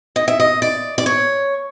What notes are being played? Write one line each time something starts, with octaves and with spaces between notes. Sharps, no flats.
D#5
E5
D#5
D5
D5
C#5